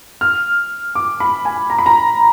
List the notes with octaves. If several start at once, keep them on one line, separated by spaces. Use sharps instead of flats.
F6
D6
B5
G#5
A#5
B5
A#5